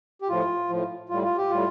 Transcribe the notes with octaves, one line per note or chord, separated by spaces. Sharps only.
G4
A2 F3 F4
A2 F3
A2 G3 F4
F4
G4
A2 G3 F4